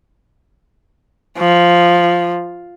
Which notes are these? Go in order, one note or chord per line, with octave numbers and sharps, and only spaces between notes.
F3